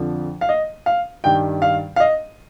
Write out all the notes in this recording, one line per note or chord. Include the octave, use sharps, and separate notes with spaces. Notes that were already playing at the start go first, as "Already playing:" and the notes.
Already playing: F2 D3 F3
F5
D#5
F5
G2 D#3 G3 G5
F5
F5
D#5